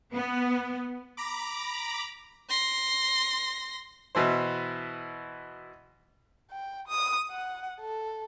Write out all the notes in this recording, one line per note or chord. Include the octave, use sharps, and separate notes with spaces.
B3
A#5 B5 D6
C6 A#6
B2 E3 E4 C5
G5
D#6
F#5
A4